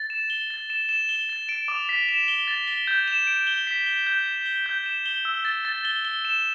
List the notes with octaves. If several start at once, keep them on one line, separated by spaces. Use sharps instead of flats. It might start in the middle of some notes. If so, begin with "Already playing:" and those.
Already playing: A6
E7
G7
A6
E7
E7
G7
A6
D7
D6
B6
E7
G7
A6
G7
G6
E7
D7
G7
B6
G7
G6
E7
G7
G6
E7
G7
E6
A6
A6
G7
G7
E7